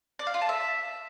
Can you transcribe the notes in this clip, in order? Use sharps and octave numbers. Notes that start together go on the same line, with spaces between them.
D5
F5
F4
A5
E5